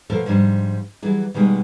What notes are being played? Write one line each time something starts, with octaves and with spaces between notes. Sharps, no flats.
B2 F3 A3 A4 A#4
G#2 F3 G3 D4
E3 F#3 G3 G#4
B2 D#3 G3 G#3 B3